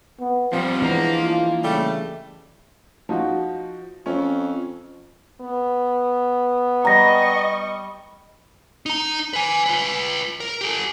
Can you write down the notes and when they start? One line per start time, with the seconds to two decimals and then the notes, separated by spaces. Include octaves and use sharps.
0.20 B3
0.53 A#2 F3 G3 C4
0.82 E3 G#3 A#3 B3 D4 A#5
1.23 F4
1.64 C#3 G3 A3
3.09 F3 D#4 F#4
4.06 F2 C#4
5.41 B3
6.85 G3 D#5 A#5 C#6 A#6
8.86 D#4 A#5
9.33 B4 G#5
9.66 F4 B4
10.40 A#4
10.61 G4 A4